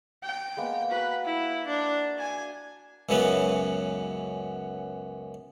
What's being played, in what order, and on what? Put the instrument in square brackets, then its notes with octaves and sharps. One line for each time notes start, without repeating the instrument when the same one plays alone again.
[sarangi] G5
[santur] G#3 A#3 B3
[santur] F#4 A#4 [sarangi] B4
[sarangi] E4
D4
G#5
[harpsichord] C#2 F#2 C#3 E3 F#3 B3